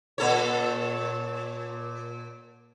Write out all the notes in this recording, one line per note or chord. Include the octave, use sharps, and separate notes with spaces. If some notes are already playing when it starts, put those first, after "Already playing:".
A#2 A4 C#5